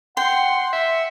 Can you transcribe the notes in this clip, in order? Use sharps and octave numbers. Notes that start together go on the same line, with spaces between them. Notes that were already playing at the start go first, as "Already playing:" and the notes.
F#5 G5 C6
E5